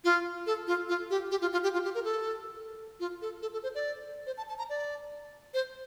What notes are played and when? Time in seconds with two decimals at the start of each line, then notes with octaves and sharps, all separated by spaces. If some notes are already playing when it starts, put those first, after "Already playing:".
0.04 F4
0.47 A4
0.67 F4
0.89 F4
1.10 G4
1.31 G4
1.41 F4
1.53 F4
1.63 G4
1.73 F4
1.84 G4
1.95 A#4
2.05 A4
3.00 F4
3.22 A4
3.42 A4
3.53 A4
3.63 C5
3.75 D5
4.27 C5
4.38 A5
4.49 A5
4.58 A#5
4.69 D5
5.54 C5